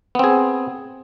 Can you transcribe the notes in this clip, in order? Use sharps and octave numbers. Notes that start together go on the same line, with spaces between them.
B3 C4 G#4